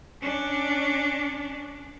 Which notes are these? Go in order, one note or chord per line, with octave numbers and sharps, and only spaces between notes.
C#4 D4